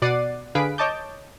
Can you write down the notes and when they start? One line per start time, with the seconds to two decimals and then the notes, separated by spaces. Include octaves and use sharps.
0.02 B2 D5 F#5 A6 C7 D#7
0.55 D3 G#4 B4 F5 B6 D7
0.78 C#5 D#5 A5 D6 G6